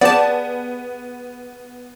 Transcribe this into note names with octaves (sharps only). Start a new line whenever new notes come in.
B3 G4 G#4 D5 F#5 A5